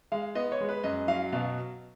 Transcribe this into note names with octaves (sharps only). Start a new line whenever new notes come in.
G#3 F5
B3 D#5
C#5
G#3
B4
F#2 D#5
F#3 F5
B2 F5